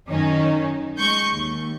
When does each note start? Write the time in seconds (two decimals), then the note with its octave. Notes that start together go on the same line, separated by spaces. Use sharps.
0.10 F#2 D#3 C#4 D#4
0.99 G#3 C#6 G6
1.32 D#2